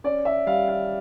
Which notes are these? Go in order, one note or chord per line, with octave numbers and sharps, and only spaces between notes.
C#4 D5
E5
G3 F5
F5